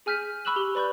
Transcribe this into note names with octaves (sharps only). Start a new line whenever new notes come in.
G#4 G#5 F6 G6 B6 D#7
B5 C#6 E6 F#6 E7 F#7
G4 G7
B4 D5 B5 C#6 G6